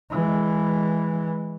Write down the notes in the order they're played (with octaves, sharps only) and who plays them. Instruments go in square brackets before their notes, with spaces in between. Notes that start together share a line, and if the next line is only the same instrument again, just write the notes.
[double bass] E3 G#3